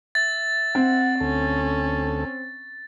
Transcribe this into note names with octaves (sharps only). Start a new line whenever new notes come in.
E5 A6
C4 F#5
D2 C#4 A4